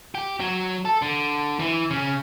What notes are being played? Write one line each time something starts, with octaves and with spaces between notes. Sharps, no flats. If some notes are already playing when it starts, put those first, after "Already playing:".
G4
F#3
A4
D3
E3
C#3